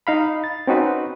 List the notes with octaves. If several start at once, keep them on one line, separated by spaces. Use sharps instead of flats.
D#4 F5 B5
A6
C4 C#4 D#4 F#4 B4